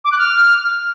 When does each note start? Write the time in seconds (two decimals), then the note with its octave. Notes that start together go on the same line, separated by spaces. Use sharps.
0.04 D6
0.12 F#6
0.19 F6